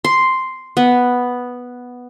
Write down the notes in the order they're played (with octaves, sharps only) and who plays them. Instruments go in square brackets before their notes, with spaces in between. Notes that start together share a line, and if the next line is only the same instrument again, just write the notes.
[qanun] C6
B3